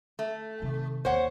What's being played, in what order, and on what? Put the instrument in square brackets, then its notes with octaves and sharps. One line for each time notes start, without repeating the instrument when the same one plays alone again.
[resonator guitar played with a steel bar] A3
[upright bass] C3 D#3
[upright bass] D#2 [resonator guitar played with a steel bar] C5 C#5 F#5